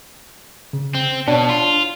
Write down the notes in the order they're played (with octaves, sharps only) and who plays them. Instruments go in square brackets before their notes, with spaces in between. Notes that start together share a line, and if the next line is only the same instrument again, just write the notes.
[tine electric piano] C#3
[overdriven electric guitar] C4
[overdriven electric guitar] B2 [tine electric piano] D4 C#5
[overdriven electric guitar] F4